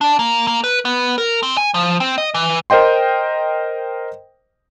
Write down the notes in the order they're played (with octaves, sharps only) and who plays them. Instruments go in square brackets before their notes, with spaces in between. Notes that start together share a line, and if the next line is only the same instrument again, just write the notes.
[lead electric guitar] D4
A#3
A#3
B4
B3
A#4
C4
G#5
F3
C4
D#5
E3
[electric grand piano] A#4 C5 D#5 G5 C6